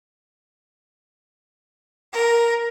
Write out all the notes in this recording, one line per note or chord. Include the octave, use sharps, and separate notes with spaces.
A#4